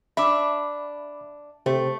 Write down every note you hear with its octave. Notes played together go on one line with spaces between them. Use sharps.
D4 E5 B5 D6
C3 A3 G4 C5